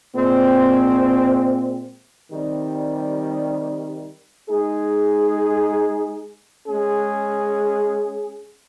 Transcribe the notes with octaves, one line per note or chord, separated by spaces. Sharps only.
A#2 G#3 C4
C3 D#3 G3
G#3 D#4 G#4
G#3 C#4 G#4